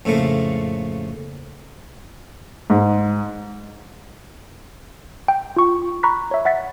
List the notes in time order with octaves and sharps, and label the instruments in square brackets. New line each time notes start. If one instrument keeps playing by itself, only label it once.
[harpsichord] F2 A2 C#3 A3 A#3
[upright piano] G#2
[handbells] G5
F4 C#6
A#5 B5 C#6 F#6 B6
C#5 E5
E5 F#5 A6 B6